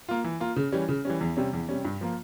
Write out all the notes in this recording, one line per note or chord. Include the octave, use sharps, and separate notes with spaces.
A#3 F4
E3
A#3 F4
C#3
E3 G3 C#4
C#3
E3 G3 C#4
E2
C3 G3 C#4
E2
C3 G3 C#4
G2
F3 A#3 F4